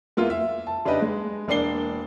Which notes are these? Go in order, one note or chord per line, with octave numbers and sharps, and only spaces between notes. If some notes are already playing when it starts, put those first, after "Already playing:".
G#3 A#3 B3 E4 F4
E5
A5
C#3 D4 D#4 G4 B4 D#5
G#3
E1 A#3 D4 D5 C7 G7